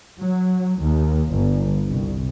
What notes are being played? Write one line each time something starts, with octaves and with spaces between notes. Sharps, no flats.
F#3
D#2
G1
C2